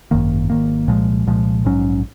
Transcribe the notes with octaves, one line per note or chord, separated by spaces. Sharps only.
G#1 F#2 D#3 A#3
G#1 F#2 D#3 A#3
C2 A#2 F3 G#3
C2 A#2 F3 G#3
A#1 G#2 F#3 C#4